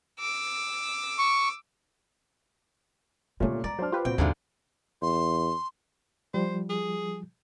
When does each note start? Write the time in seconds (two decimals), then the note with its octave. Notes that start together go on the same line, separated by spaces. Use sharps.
0.19 D6 E6
1.19 C#6
3.40 A#2 D3 G3 A3 B3 C#4
3.64 G#3 D5 A#5
3.79 F#3 D4 C5 F6
3.92 F4 G4 B4
4.05 A#2 C4 F#4 G5
4.18 D#2 G#2 B2 D3 E4 F4
5.02 E2 C6
6.34 F3 G3 C5
6.70 G#4